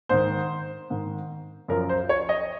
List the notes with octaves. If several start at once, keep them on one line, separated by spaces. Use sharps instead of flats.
G#2 D#3 C5
G#2 D#3
F#2 F3 A#4
C5
C#5
D#5